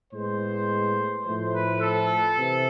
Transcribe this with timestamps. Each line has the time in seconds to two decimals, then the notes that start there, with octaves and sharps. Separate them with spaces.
0.13 A2 G#3 B3 C5
1.26 A2 F3 A3 C5
1.54 B4
1.81 A4
2.37 C3 E3